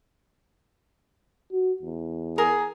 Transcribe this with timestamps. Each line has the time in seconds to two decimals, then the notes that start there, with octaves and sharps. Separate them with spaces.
1.52 F#4
1.82 E2
2.38 G#4 A#4